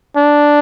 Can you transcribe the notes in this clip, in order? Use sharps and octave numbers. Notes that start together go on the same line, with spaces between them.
D4